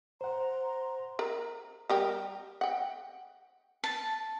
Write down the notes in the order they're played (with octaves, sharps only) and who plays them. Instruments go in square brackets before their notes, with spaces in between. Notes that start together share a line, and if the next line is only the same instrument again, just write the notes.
[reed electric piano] C5 F#5 [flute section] A#5 C6
[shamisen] A#4 A#5
G3 A#4 G5
F#5 G5
[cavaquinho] A5